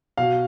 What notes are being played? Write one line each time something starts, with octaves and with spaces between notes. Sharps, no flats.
B2 F5